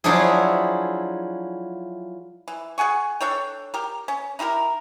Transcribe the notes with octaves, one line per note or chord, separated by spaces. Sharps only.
F3 F#3 D4 E4 G#4
E3
G#4 F#5 G#5 C#6
D4 A4 C#5 G5
G4 A#4
C#4
D#4 E4 G4 A#4